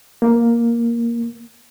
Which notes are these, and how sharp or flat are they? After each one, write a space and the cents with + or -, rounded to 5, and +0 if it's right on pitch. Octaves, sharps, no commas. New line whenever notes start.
A#3 +5